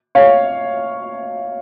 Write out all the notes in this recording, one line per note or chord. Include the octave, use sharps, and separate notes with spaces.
C#5 F5